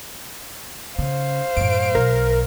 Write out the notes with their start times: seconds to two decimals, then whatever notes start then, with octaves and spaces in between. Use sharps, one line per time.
0.99 C#3 C5 F5
1.57 F#2 A2 D7
1.95 B1 A#4